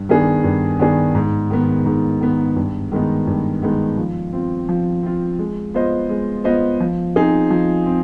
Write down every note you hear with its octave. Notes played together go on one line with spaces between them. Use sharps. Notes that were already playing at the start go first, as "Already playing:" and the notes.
Already playing: G2
D#3 B3 D4 G#4
G2
D#3 B3 D4 G#4
G#2
D#3 B3
G#2
D#3 B3
G2
D#3 G#3 B3 D#4
G2
D#3 G#3 B3 D#4
F3
C4 F4
F3
C4 F4
G#3
B3 F4 C5 D#5
G#3
B3 F4 C5 D#5
F3
C4 D#4 G#4
F3
C4